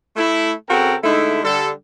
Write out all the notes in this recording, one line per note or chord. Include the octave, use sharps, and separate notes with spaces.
A3 E4
C#3 C4 F#4 A4 A#4 G5
D3 G#3 A3 D#4 E4
D3 G3 A4